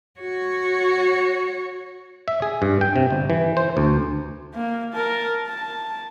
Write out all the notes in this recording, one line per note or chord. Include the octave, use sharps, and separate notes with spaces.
F#4 C#5
E5
G#4
G2
G5
C3
G1
E3
C5
D2
A#3
A#4 A5
A5